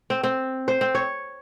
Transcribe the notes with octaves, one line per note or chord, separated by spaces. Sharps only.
C4
C4
C5
C4
C#5